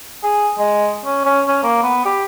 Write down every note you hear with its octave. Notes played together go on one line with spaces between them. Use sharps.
G#4
G#3
C#4
C#4
C#4
A#3
B3
G4